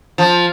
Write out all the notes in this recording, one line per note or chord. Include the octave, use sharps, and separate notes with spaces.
F3